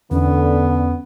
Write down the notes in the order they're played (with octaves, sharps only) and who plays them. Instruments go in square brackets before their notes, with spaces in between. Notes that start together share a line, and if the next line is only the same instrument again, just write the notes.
[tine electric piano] E2 [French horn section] D3 [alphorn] B3 [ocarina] C#4